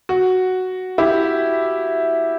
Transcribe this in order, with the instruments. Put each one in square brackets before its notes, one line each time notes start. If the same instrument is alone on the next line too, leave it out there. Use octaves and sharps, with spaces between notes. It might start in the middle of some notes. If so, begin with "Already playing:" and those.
[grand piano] F#4
E4 G4